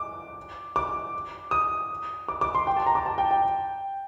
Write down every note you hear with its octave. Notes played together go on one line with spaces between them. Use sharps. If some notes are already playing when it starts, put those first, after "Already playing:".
Already playing: D6
D6
D#6
D6
D6
C6
G5
A5
A#5
D6
A5
G5
G5